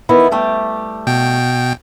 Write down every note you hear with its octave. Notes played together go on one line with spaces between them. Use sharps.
D#3 B3 E4
G3 A3 G4
B2 G5